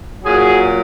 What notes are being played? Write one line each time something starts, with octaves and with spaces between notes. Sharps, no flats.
A#2 F#3 F#4 G#4